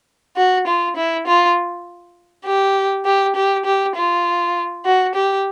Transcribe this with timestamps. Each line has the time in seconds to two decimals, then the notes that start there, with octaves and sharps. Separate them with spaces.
0.37 F#4
0.67 F4
0.96 E4
1.27 F4
2.46 G4
3.05 G4
3.36 G4
3.65 G4
3.96 F4
4.85 F#4
5.15 G4